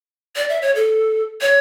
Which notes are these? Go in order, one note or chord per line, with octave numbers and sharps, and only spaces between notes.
D5
E5
C#5
A4
C#5